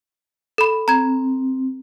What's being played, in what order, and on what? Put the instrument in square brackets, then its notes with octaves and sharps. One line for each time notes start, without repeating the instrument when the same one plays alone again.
[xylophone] A4 B5
[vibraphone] C4 [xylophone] A#5 G#6